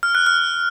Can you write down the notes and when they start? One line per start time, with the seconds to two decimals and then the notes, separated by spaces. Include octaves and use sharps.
0.03 F6
0.15 F#6
0.26 F6